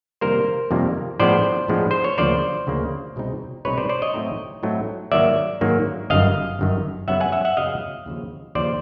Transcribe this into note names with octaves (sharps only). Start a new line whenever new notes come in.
F2 C3 D#3 G3 A#3 A#4 C5
F2 C3 D#3 G3 A#3
A2 F3 G#3 B3 D4 C5 D5
A2 F3 G#3 B3 D4
C5
C#5
D2 C#3 F3 A#3 C5 D5
D2 C#3 F3 A#3
C2 B2 G#3 C4 D#4
C2 B2 G#3 C4 D#4 B4 C#5
C5 D5
C5 D5
C#5 D#5
A2 F#3 A3 C4 D#4
A2 F#3 A3 C4 D#4
G#2 D#3 F#3 A#3 D5 E5
G#2 D#3 F#3 A#3
G1 F#2 D#3 D#5 F5
G1 F#2 D#3
F#2 C#3 F#3 B3 E5 F#5
F#5 G#5
E5 F#5
E5 F#5
F#2 C#3 F#3 B3 D#5 F5
D#2 C#3 F3
D#2 C#3 F3 C5 D5